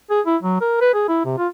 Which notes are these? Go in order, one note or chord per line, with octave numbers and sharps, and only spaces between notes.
G#4
E4
F#3
A#4
B4
G#4
E4
C3
F4